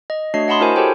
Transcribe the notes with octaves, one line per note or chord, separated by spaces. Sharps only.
D#5
A3 D4 F#4 C#5 D#5 C7
D#5 F#5 A5 B5 C6 D#6
E4 F#4 A#4 C5 G#5 C6
G4 A4 C5 C#5 G5 A5